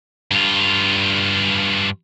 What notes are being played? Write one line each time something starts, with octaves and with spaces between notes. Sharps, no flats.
G2 F4